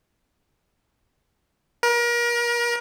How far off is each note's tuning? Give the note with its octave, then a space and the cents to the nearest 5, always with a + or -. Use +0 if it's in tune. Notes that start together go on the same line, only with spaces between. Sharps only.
A#4 +35